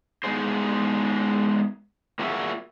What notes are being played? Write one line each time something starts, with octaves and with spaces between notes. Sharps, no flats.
G#3 B3 D#4 G#4 C5
A#3 F4 F#4 G#4 E5